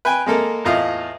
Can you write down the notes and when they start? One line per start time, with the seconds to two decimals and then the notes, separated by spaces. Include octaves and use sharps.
0.05 B4 G5 G#5
0.26 G#3 A#3 A4 A#4
0.65 E2 A2 F4 D#5 F5